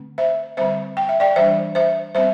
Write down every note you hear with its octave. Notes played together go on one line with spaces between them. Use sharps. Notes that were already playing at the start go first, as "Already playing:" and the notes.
Already playing: D3 A3 C4
C5 E5
D3 G3 C4 C5 E5
G5
E5
D5 G5
E3 G3 D4 C5 E5
C5 E5
G3 C4 C5 E5